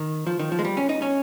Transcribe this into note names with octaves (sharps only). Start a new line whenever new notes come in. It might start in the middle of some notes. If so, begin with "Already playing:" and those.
Already playing: D#3
F3
D#3
F3
G#3
G3
C#4
D#4
C#4